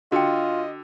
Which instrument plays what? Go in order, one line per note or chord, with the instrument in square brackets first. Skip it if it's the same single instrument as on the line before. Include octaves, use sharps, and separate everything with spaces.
[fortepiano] D3 [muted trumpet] F4 [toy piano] F#4 G5 [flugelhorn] D#5